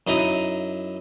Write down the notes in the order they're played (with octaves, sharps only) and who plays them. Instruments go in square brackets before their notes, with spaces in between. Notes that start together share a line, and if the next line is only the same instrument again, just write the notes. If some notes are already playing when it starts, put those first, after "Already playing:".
[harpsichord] F#2 D#4 E4 A#5 D#6